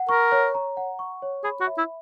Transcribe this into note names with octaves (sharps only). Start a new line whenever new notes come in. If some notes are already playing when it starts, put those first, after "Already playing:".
Already playing: F#5
A#4 C#6
C#5
A#5
F#5
C#6
C#5
G#4 B5
F#4
E5
E4